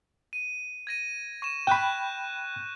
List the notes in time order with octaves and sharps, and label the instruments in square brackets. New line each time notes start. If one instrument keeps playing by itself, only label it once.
[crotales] D#7
G#6 A#6 D#7
C#6 D#7 E7
[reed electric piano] G5 B5 [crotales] C#6 F#6 G6